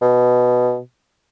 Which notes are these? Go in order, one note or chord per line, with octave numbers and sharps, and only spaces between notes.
B2